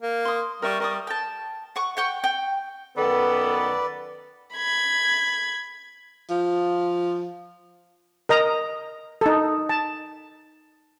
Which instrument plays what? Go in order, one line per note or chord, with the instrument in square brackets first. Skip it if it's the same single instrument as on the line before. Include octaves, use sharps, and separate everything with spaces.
[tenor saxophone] A#3
[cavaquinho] C6 D#6
[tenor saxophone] G3 [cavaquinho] A#4 E5 C#6
[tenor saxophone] G3 [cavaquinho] A#4 C#6 D#6
[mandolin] G5 A5
F#5 C#6
F#5 G5 C#6
G5
[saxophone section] F#2 D#3 A4 [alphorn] B3 [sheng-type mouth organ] B4 D5
[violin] B5 G#6
[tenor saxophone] F3
[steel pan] A#4 D#5 A#5
D#4 A4
A5